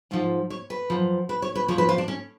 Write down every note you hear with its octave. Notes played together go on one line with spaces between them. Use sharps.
G#2 F3 F4
C#5
B4
F#2 F3
B4
C#5
B4
F2 F3 C#5
B4
F4
D4
C#4